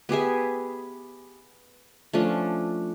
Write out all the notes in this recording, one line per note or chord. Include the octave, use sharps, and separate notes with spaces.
B3 G4 G#4 E5
F3 A3 C#4 D4